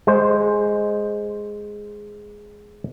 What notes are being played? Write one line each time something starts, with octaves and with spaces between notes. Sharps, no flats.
G#3 C5